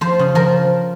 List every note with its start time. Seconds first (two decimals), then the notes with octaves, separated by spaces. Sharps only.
0.01 F3 C5
0.19 C#3
0.35 F3 A#4